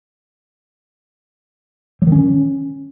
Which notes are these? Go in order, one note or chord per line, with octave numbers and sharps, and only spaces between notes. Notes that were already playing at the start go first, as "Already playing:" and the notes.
F#3
D#3
C#4